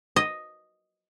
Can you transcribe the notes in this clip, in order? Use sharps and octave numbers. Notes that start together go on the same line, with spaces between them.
D#5